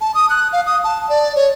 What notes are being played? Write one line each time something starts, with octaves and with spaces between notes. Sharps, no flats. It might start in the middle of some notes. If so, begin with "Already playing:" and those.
A5
D#6
F#6
F5
D#6
A5
D5
C#5